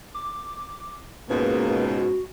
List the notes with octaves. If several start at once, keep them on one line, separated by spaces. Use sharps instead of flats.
D6
C#2 G#2 B2 A#3 B4
F#4